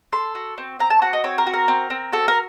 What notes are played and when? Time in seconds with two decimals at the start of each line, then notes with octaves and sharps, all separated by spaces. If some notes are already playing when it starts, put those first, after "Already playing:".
0.12 A4 C6
0.35 F#4
0.58 C4
0.79 C4 A#5
0.90 A5
1.02 F#4 F#5
1.13 D#5
1.24 C4 C#5
1.38 A#4
1.47 F#4
1.54 A#4
1.68 C4
1.90 C4
2.12 F#4 A4
2.28 A#4